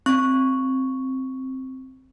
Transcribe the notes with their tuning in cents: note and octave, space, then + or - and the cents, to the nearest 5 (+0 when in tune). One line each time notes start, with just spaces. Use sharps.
C4 +0 C#6 +0